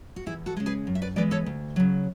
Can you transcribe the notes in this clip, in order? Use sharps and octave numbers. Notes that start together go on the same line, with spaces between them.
F#4
E2 E4 G#4
F#4 A4
C#3 G#3
G#4 B4
F#2
E5
B4 D5
E3 G#3 B3 B4 D5
A4 C#5
D2
C#3 F#3